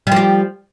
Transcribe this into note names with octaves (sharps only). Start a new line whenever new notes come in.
F3 G3 G4